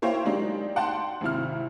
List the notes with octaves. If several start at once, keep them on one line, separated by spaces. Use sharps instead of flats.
A#3 E4 C5 C#5 F5 G5
F#3 G#3 D4 D#4 G4
F#5 G5 A5 C6
G#1 C3 E4 F6